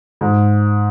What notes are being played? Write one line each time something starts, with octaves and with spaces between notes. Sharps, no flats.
G#2